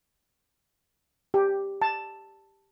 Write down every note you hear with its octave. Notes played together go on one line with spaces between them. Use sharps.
G4
A5